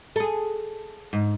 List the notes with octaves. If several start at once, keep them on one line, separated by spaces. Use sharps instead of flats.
G#4 A4
G#2